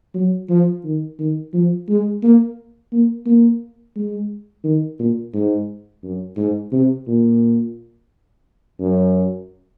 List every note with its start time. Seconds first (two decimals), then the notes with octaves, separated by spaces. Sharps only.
0.15 F#3
0.50 F3
0.84 D#3
1.19 D#3
1.54 F3
1.89 G#3
2.23 A#3
2.92 A#3
3.26 A#3
3.96 G#3
4.64 D#3
4.99 A#2
5.34 G#2
6.04 F#2
6.37 G#2
6.72 C3
7.07 A#2
8.80 F#2